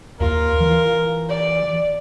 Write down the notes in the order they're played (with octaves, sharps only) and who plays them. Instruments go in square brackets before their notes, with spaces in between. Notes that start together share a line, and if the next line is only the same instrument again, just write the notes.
[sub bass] D#2 [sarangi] F4 [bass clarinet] A#4
[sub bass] E3
[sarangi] D5